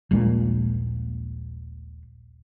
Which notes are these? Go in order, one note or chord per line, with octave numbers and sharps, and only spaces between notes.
D#1 A#1 A#2 G#3